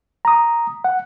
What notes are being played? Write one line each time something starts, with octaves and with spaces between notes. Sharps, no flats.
A#5 D#6
F#5